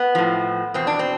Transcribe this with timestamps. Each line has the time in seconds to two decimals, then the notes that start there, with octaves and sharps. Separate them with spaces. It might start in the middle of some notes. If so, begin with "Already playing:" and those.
Already playing: B3
0.15 A2 F3
0.74 E2 B2 C4
0.87 D4
0.99 C4